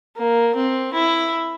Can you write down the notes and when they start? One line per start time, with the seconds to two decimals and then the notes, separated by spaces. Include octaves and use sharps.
0.17 A#3
0.55 C4
0.94 E4